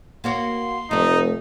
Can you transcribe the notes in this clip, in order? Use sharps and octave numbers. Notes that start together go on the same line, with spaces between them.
A#3 F#4 C#5 C6
F1 A3 D#4 D5